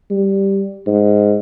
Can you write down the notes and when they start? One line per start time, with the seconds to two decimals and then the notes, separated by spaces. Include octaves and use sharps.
0.10 G3
0.87 G#2